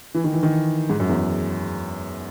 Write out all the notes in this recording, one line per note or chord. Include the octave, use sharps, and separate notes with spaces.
E3
D#3
E3
D#3
G#2
F#2
E2